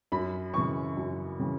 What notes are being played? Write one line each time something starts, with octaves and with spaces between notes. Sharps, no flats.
F#2 B5
C#3 E3 C#6
F#2
C#3 E3